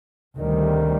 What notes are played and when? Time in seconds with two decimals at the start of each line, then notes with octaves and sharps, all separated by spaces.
0.36 D2 C3 D#3 G3